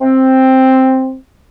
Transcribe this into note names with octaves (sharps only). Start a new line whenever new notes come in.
C4